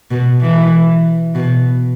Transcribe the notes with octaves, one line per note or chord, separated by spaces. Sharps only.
B2
E3
B2